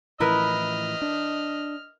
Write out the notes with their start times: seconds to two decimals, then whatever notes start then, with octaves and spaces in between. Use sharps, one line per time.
0.20 A2 E3 F3 E4 A#4 B4 D#5 F6
1.02 D4